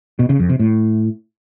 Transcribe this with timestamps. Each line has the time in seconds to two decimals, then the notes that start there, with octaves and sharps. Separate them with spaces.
0.19 B2
0.29 C#3
0.39 F2
0.49 C3
0.59 A2